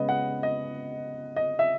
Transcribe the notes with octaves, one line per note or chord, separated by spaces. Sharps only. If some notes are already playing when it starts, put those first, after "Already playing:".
Already playing: C#3 G#3 B3 D#5
F#5
D#5
D#5
E5